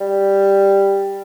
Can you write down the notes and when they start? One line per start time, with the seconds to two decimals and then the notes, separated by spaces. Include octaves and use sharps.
0.01 G3